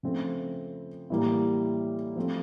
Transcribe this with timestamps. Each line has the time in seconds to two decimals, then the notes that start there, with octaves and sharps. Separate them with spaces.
0.03 C#3 F3 A3 C4
1.10 A2 E3 G3 A#3
2.16 F3 A3 C4